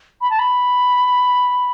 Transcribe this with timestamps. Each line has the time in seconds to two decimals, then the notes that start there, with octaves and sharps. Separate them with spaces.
0.21 B5
0.30 A5
0.39 B5